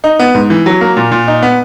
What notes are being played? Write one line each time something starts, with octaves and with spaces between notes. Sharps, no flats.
D#4
B3
G#2
E3
F#3
A#3
A#2
A#2
D#4
B3